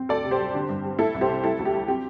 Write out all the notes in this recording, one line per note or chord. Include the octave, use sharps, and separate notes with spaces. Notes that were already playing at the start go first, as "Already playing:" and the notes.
Already playing: C4
D2 A4 D5
C3
G4 C5
G3
D3
G2
G3
A3 E4 A4
C2
G4 C5
C3
G3 E4 A4
D2
G4
G3
C4 G4